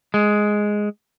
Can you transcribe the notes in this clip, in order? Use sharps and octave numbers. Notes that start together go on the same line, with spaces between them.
G#3